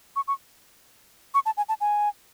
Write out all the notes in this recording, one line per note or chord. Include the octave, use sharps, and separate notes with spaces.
C#6
C#6
C#6
A5
G#5
A5
G#5